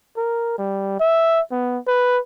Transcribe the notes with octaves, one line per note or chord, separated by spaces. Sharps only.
A#4
G3
E5
B3
B4